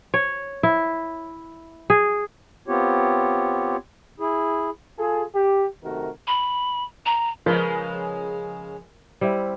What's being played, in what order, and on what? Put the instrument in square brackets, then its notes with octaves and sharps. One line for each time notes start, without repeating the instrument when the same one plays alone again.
[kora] C#5
E4
G#4
[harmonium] B3 C4 F4 G4 C#5
E4 G#4
[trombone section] F4 G#4 A4
G4
F#2 C3 D#3 A3 F#4 A#4
[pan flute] B5
A#5
[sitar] C#3 G#3 [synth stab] F3 [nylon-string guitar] A#4 [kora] B4
[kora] G3 C4 E4